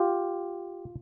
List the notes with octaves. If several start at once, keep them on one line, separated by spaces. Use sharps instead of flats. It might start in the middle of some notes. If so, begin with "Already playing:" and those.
Already playing: F4 G4